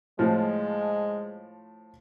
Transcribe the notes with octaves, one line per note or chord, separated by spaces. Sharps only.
A2 F3 G#3